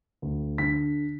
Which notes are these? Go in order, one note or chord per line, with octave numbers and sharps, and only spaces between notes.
D2
D3 B6